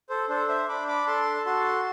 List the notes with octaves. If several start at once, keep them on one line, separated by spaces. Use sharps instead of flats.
A4 C5
D4 A4 C5
C5 E5
D4 B5 D6
B5 D6
A4 A5 C6
F#4 A5 C6